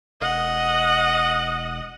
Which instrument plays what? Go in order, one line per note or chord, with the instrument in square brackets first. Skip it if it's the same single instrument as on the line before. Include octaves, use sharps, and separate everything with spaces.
[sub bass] E1 [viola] D#5 F#5